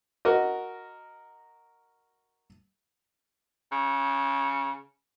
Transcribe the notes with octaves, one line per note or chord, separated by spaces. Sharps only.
F#4 A#4 D#5
C#3